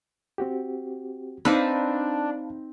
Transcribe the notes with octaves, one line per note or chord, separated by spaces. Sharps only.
C4 F#4 G4
C4 D4 D#4 B4 F5 A5 B5